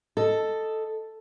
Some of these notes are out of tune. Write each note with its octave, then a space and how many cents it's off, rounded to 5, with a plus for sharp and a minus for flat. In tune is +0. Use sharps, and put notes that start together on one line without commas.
A4 +0 D#5 +0